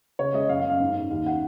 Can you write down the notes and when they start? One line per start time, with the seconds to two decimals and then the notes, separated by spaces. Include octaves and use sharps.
0.19 C#3 C#5
0.34 G#3 D#5
0.49 F#2 F5
0.59 F5
0.65 F#2
0.70 F5
0.80 G#2
0.96 G#2
1.11 D#2 F5
1.26 F#5